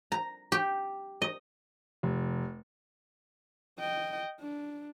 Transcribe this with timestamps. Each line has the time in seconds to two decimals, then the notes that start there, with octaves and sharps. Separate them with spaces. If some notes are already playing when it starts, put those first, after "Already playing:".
0.12 A#5
0.52 G4
1.22 D#5
2.03 F1
3.79 D#5 G5
4.40 D4